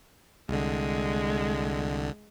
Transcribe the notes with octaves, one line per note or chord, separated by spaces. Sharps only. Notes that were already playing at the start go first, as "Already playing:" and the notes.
C2 D3 G#3